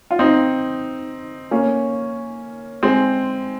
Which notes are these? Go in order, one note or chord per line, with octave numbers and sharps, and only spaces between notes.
F4
C4 D#4
A#3 C#4
G#3 C4